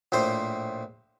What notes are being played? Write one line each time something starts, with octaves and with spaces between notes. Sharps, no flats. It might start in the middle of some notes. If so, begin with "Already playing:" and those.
A#1 A2 C5